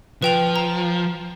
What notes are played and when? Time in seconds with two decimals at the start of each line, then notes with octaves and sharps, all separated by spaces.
0.22 F3 B4 G5 F7
0.56 A#5